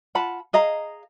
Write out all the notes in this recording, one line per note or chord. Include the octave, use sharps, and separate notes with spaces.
F4 F#5 A5 B5
G#4 D#5 F5 A#5